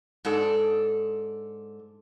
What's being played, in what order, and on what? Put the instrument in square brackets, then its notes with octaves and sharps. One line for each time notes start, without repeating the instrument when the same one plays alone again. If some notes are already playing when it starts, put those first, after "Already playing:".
[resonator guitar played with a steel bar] G#2 D4 A4